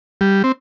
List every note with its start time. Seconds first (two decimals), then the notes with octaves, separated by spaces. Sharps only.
0.21 G3
0.44 C4